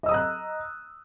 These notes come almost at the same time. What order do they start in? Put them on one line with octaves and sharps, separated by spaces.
D#5 E6 D#6 A#5 F#6